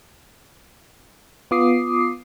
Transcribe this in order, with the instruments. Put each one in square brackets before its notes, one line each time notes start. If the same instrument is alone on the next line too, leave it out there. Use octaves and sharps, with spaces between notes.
[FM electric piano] B3 F4 D6 D#6 C7